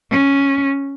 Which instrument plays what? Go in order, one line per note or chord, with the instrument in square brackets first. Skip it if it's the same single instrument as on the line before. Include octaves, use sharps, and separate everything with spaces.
[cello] C#4